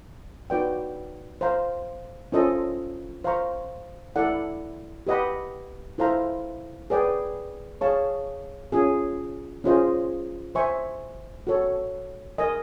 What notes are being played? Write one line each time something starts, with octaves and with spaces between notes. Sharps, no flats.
D#4 F#4 B4 D5 G5
C5 F5 A#5
C#4 F4 A4 C5 D#5
C5 F5 A#5 C#6
E4 A4 D5 F#5
G4 B4 D#5 F#5 B5
E4 A4 C5 F5 A#5
G#4 B4 D5 G5
G#4 C#5 F5 A5 C#6
C#4 F4 G#4
C#4 F4 G#4 C5 D#5
C5 E5 G#5 C#6
F#4 A4 C#5
A#4 D#5 G#5